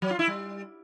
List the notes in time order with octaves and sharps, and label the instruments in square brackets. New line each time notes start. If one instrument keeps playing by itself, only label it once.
[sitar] F#3
F4
E4
G3